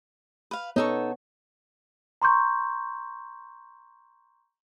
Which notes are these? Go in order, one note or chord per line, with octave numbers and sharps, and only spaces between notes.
B4 F5
B3 D#4 A4 C#5 C#6
A#5 C6 C#6 G6